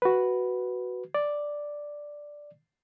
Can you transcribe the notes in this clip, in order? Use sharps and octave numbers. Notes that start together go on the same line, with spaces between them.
F#4 B4
D5